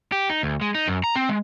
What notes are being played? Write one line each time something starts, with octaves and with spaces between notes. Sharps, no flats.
G4
D#4
D2
G#3
D#4
F#2
A#5
C4
G#3